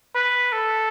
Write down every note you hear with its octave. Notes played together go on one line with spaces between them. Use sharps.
B4
A4